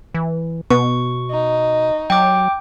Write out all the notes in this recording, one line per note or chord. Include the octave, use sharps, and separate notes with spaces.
E3
B2 B3 C#6
D#4
F#3 G5 D6